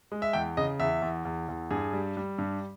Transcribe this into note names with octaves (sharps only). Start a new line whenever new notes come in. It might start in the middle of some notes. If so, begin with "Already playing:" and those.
G#3
E5
E2 G5
C#3 D#5
E2 E5
E2
E2
E2
G2 G#4
G3
G3
G2